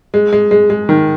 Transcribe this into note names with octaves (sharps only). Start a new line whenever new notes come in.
G#3
G#3
G#3
G#3
D#3